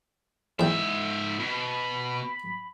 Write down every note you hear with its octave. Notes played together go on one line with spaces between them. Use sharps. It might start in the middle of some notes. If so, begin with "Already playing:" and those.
E2 G#2 E5 G5
B2 B5